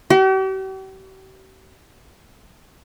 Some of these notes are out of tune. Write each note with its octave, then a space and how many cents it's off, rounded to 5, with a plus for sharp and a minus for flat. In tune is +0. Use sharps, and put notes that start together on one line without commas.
G4 -45